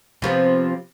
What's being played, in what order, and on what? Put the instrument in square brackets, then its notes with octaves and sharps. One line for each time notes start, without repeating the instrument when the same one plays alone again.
[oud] C3 F3 B3